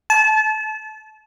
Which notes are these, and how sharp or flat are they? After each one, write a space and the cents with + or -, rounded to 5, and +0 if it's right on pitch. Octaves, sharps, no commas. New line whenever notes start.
A5 -30